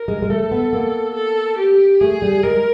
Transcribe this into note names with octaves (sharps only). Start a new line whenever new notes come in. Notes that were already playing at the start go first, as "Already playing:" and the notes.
Already playing: A#4
G#3
G#3
A3 A4
B3
A#3
A4
G4
A3 G#4
G3
G#3 A#4